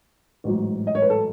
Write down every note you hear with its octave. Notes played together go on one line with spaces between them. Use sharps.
A1 G#2 F#3
D#5
C#5
B4
A4